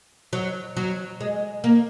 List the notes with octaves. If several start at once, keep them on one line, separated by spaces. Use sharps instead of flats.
F#3
F#3
G#3
A#3